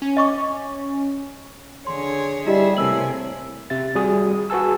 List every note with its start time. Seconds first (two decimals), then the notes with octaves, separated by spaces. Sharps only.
0.02 C#4
0.17 D#5 C#6 D6
1.87 D3 G#4 C#5 C6
2.47 G3 E4 G4 G#4 D#5 E5
2.77 A2 C3 A#3 G#5 E6 F#7
3.70 C3 E5 A6
3.95 G#1 G3 F#4 G#4 D#6
4.50 F#4 G#4 B4 G#5 A5 E6